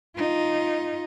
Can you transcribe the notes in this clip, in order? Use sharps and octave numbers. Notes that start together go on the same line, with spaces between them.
D#4 F4